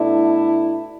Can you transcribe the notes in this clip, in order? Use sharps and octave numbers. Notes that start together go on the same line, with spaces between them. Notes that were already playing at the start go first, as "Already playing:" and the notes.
Already playing: B2 A3 D4 E4